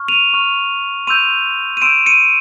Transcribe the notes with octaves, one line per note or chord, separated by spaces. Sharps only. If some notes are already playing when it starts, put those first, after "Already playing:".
Already playing: C#6 F6
D#7 F7
C#6 F6
C6 E6 G6 D#7 F7
D#7
C6 E6 G6 D7 E7
C#7 D#7